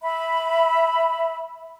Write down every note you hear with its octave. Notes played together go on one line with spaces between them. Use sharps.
E5 B5